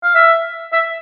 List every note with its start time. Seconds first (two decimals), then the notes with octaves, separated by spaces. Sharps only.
0.03 F5
0.15 E5
0.73 E5